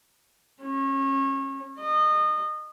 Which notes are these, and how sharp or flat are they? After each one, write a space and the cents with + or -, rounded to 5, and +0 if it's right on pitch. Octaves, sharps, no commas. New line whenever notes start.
C#4 -30
D#5 -25